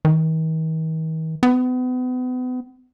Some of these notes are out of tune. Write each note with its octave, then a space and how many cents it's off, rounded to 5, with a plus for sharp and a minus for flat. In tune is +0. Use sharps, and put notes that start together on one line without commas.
D#3 +45
B3 +35